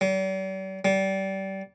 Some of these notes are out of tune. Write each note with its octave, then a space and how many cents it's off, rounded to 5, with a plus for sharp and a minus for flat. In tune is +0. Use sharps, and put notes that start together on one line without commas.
G3 -45
G3 -25